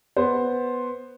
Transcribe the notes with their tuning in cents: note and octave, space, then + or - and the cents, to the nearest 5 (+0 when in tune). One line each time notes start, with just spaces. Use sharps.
B3 +0 C5 +5